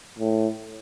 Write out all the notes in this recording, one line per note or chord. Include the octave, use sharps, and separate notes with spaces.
A2